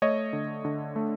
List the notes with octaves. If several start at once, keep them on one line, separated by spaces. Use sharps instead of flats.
A3 C#5 D#5
D3
D3
A3